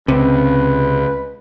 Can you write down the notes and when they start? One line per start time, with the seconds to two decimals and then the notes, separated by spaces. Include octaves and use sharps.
0.08 C#2 C3 B4